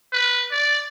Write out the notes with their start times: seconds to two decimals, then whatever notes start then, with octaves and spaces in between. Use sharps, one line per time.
0.13 B4
0.51 D5